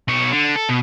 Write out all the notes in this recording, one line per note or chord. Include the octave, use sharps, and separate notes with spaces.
B2 C#5
D3
A4
B2